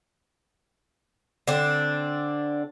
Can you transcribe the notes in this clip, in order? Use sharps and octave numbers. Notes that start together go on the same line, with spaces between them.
D3 C4 D4